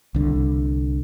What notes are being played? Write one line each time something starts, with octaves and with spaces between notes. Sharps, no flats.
C2 D3